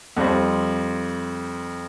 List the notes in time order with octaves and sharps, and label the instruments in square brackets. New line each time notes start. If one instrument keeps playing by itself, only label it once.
[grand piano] F2 G3 C4